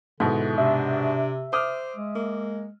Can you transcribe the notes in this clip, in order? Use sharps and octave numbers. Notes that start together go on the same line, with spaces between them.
G#2 B2 D3 E4
C3 D4 E5
C5 D6 D#6 F6
G#3
A#3